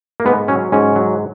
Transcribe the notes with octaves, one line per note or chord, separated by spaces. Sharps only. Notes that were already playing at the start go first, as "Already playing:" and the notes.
A#3
G#2 B3
F#3 C#4
G#2 C#4
F#3